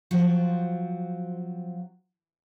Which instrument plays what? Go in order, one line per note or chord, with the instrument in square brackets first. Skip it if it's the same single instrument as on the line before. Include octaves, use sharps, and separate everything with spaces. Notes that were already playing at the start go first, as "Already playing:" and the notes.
[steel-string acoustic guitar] F3 F#3 C4 F4 F#4